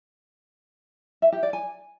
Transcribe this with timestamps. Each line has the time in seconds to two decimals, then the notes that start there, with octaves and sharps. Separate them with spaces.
1.22 E5
1.32 G4
1.43 D5
1.53 G#5